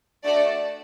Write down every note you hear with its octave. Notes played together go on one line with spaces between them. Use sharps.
A3 D4 F#4 A4 D5